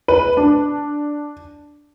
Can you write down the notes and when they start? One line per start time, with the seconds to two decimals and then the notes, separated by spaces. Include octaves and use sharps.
0.08 B4
0.37 D4